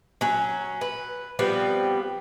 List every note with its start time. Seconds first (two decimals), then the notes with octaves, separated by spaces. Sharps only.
0.21 F#3 C#4
0.81 B4
1.39 F3 G3 B3 C4